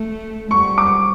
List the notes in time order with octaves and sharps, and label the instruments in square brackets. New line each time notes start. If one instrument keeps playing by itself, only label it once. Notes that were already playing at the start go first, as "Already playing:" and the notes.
Already playing: [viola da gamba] A3
[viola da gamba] G3 [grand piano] C#6
[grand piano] D6